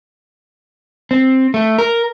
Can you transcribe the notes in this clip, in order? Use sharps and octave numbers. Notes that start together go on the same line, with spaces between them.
C4
A3
A#4